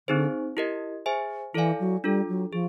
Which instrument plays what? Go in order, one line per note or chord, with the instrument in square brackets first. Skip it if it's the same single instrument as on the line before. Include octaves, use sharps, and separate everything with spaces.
[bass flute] D3 [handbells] C4 D#4 G#4 C5
[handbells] E4 G4 A#4 D#5
G#4 C5 E5 G#5
[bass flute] E3 [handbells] E4 A4 D5 F5 G#5
[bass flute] F#3
[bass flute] G3 [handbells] D4 F4 A4
[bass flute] F#3
[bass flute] F3 [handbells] G#4